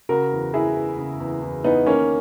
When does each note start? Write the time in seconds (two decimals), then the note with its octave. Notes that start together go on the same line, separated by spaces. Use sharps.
0.09 C#3 F#4 A#4
0.32 E2
0.54 E2 E4 G#4
0.75 E3
0.98 C#3
1.20 E2
1.42 E2
1.64 E3 B3 D#4
1.86 D#3 A#3 C#4